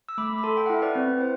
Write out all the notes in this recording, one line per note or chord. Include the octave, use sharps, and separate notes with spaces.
E6
A3 B5 D6
B5
A4 A5 C6
G5
F#5
E4 E5
B4 D5
C4
C5